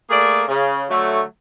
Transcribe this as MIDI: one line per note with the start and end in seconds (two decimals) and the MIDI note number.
0.10 0.43 57
0.10 0.43 58
0.10 0.43 68
0.10 0.43 74
0.48 0.84 49
0.90 1.22 50
0.90 1.22 54
0.90 1.22 57